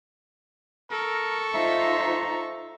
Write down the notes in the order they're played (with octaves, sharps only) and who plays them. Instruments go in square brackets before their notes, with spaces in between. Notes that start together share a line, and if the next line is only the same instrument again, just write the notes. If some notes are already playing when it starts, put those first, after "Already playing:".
[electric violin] A4 C#6 [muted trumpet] A#4
[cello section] D#4 F4 C5 [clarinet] E5 [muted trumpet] A#5